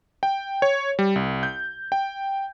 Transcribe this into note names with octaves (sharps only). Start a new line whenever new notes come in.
G5
C#5
G3
C2
G6
G5